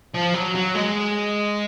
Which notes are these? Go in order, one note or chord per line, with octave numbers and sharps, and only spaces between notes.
F3
F#3
F#3
G#3